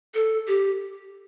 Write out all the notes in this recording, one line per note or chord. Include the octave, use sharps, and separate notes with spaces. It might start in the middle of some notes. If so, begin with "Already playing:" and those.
A4
G4